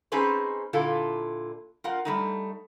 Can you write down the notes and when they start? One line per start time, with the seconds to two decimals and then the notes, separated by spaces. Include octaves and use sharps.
0.12 C4 C#4 D#4 G#4 B4 C5
0.73 A#2 D3 E4 F4 A4
1.84 F4 A#4 F#5
2.05 G3 A3 D#4